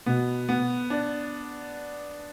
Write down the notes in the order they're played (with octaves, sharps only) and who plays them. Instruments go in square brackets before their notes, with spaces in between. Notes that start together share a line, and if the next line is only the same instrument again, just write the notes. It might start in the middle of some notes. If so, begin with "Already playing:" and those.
[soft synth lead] B2 [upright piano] B3
[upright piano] B3
D4